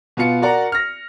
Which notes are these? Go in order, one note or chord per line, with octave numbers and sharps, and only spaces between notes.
B2 B3 F4 F5 C#7
F#4 A#4 D5 F#5 A#5
F6 A#6